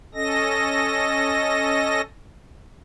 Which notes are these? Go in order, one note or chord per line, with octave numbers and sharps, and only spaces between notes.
C#4 A4 D#5 A#6